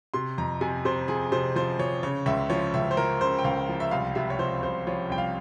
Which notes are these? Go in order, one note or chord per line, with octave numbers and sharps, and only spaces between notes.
C3 C6
F2 A#5
C3 G#5
C3 C5
F3 G#4
C3 C5
F3 C5
F3 C#5
C#3 C#5
C#2 E5
F3 C#5
C#2 E5
C5
F3 A#4
C#3 C5
G5
C#2 F5
F3
E5
C2 F5
C3 E5
C#5
F3 C5
C2 C5
F3 C#5
C2 G5
F5